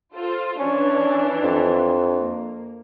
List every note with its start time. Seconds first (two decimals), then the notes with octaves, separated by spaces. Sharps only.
0.14 F4 A4 C5
0.59 E3 C#4 D4
1.43 F2
2.17 A#3